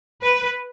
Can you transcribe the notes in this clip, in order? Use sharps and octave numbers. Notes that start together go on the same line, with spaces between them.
B4